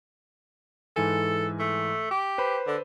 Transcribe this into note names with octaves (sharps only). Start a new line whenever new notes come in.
G#2 E3 A4 G#5
A3
G4
B4 C5 B5
D3